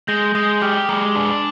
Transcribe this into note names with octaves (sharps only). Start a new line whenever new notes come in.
G#3 G6 A#6
G#3 D#6 G6
G4 D6 F6
G#3 A#5 D6
D4 G#5 C6